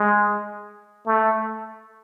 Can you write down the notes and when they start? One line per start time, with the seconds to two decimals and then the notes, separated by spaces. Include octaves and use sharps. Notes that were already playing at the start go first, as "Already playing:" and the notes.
Already playing: G#3
1.07 A3